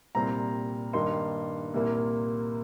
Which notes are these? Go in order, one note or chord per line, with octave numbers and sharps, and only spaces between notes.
C2 A#2 G3 C4 A#5
G2 D#3 A#3 D#4 C6
C2 A#2 A#3